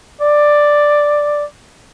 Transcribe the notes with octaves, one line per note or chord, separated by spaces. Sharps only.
D5